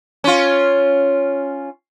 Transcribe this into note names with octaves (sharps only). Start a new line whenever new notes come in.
C#4 F4